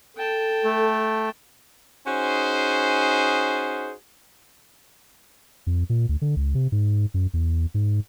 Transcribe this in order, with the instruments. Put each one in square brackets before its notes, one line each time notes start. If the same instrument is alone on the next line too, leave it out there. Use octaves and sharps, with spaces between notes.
[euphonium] A4 [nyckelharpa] G5 A5
[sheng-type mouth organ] A3
[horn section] C#4 D#4 F#4 G#4 C5
[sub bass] F2
A#2
D2
D3
C#2
C3
G#2
F#2
E2
G#2